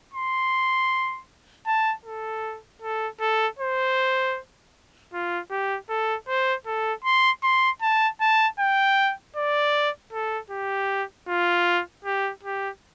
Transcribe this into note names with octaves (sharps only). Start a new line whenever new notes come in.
C6
A5
A4
A4
A4
C5
F4
G4
A4
C5
A4
C6
C6
A5
A5
G5
D5
A4
G4
F4
G4
G4